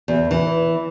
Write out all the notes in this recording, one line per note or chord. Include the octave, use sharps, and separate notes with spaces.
E2
E3